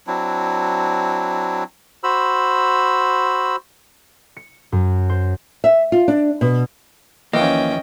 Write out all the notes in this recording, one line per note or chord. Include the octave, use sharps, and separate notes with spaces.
F#3 C4 D4 E4
F#4 C5 B5 E6
C#7
F#2
C5
E5
F4
D4
B2
D#2 E3 F3 A#3 C#4 D#5 G5